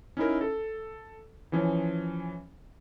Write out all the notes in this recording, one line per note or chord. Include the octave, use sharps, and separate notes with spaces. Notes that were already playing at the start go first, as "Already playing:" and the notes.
C#4 D#4 E4 A#4
A4
E3 F3 C#4